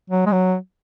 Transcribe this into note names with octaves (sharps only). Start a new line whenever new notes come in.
F#3
G#3
F#3